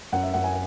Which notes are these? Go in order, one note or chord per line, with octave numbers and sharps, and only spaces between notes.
F#2 F#5
E5
F#2 F#5
G#5